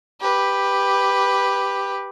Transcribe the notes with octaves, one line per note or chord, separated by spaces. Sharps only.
G4 B4